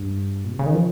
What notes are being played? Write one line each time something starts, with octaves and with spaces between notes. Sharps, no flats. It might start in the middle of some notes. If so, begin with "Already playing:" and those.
Already playing: G2
A#2
C3
C#3
D#3
F3